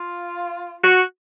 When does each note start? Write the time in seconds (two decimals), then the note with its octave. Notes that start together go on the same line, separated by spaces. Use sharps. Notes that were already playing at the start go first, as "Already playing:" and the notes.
Already playing: F4
0.83 F#4